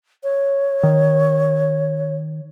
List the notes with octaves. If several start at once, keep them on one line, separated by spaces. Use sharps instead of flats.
C#5
D#3